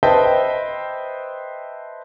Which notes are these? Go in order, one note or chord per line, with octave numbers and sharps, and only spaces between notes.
B4 C5 D#5 E5 G5 A5